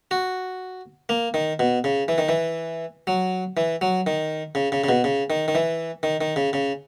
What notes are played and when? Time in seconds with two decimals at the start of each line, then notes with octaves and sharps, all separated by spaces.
0.11 F#4
1.09 A#3
1.34 D#3
1.59 B2
1.84 C#3
2.08 E3
2.18 D#3
2.29 E3
3.07 F#3
3.57 E3
3.81 F#3
4.07 D#3
4.55 C#3
4.72 C#3
4.84 C#3
4.89 B2
5.04 C#3
5.30 D#3
5.48 D#3
5.55 E3
6.03 D#3
6.21 D#3
6.36 C#3
6.53 C#3